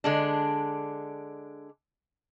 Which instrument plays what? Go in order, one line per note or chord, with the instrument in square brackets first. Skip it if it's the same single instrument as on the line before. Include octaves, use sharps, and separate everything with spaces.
[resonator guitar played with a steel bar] D3 G#3 D4